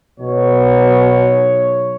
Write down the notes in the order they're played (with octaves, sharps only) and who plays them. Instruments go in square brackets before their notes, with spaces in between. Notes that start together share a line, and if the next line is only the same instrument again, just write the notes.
[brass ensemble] B1 C#5 [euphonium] B2